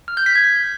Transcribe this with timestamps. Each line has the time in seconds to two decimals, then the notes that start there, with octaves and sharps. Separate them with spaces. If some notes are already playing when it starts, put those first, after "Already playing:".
0.08 F6
0.17 G6
0.26 B6
0.35 G#6